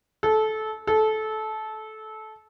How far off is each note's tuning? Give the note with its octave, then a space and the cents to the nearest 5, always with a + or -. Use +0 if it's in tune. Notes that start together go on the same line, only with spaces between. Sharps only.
A4 -20
A4 -20